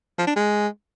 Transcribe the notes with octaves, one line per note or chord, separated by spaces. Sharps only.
F3
D4
G#3